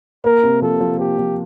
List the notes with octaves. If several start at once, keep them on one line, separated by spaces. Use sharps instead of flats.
A#3 A#4
C3
F3 A4
F3
A#3 G4
F3